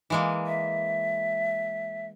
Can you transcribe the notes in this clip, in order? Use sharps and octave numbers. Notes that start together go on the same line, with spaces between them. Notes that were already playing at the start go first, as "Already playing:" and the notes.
E3 G#3 A#3
E5